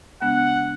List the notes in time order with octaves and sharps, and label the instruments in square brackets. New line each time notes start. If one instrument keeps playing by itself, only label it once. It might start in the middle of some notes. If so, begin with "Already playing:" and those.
[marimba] C#3 G#3 B3 D4 [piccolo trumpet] F#5